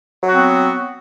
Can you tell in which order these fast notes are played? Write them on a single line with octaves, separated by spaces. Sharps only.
F#3 F#4 C4 B3